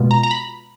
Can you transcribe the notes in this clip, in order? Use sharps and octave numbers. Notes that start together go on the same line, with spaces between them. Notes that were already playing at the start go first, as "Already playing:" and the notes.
Already playing: B2 G#3 B3 F4
A#5
A#5
B5